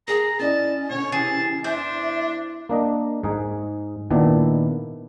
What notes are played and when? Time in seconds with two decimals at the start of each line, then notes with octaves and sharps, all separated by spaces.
0.08 G#4 A#4 G#5 A#5
0.39 C#4 E4 D5 D#5 A5
0.90 B2 D3 C#5
1.12 C3 E3 G#4 A5
1.64 E2 D4 C5 E5
2.69 A#3 D4 D#5
3.24 G#2 D#4 G#4
4.10 A#2 D#3 B3 D4 E4